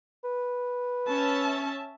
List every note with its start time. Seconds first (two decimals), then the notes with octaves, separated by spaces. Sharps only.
0.24 B4
1.11 C#4 E5 A5